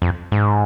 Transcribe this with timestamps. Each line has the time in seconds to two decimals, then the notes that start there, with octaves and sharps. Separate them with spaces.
0.02 F2
0.32 G#2